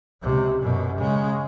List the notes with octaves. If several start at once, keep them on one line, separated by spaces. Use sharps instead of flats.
C#2 C3
F#2 B2
C#3 G#3